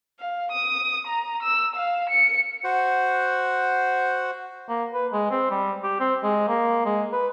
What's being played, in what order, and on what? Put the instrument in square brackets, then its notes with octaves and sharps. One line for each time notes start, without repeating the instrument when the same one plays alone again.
[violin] F5
D#6
A#5
E6
F5
C#7
[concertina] F#4 C5 F#5
[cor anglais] A#3
B4
G#3
C4
G3
G4
C4
G#3
A#3
G#3
B4